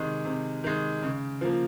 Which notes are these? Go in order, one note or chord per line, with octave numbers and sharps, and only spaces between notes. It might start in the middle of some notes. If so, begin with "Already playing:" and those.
Already playing: C3 D#3 G#3
C3
D#3 G#3
C#3
F3 A#3